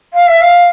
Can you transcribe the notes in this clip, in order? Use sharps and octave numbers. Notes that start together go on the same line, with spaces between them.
F5
E5
F5